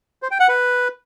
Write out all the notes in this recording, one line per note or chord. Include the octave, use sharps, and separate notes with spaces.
C5
G5
F#5
B4